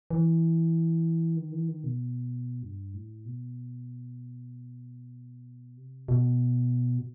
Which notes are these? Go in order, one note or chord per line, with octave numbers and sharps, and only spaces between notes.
E3
D#3
E3
D#3
B2
G2
A2
B2
C3
B2